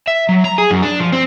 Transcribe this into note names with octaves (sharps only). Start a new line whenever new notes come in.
E5
F#3
A#5
G#4
F#2
D4
F3
C4